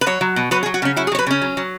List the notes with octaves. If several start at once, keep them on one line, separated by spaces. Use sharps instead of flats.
B4
F#3 C#5
F#3
B2
F#3 B4
G#4
F#3
F#4
C#3 C#4
F#3 E4
G#4
F#3 C#5
B4
C#3 C#4
F#3
F#3